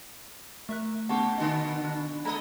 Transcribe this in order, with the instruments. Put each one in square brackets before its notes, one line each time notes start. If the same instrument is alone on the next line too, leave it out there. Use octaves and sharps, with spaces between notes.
[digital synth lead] A3 [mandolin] A#4 E5 F#6
[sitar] C#3 G4 [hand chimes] B3 F#5 [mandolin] A5 C#6
[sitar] B2 D3 [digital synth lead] D#5
[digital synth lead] D4
[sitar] G#3 D#5 [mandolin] G5 A#5 B5